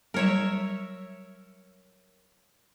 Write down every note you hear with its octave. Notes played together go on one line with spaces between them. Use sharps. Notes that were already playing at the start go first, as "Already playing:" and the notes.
F#3 G3 A#4 C#5 E5